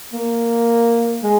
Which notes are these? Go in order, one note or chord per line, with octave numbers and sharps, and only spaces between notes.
A#3
G#3